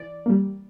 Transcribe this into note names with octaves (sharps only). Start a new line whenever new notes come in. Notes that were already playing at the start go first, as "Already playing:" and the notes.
Already playing: E3 D5
G3 A#3